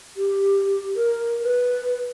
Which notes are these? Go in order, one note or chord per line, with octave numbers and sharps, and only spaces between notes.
G4
A#4
B4